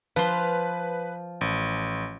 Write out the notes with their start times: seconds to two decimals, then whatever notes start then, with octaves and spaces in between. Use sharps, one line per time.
0.16 F3 B4 C6
1.41 A1